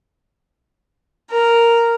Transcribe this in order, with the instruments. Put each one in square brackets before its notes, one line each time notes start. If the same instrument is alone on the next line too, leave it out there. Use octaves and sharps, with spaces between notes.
[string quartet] A#4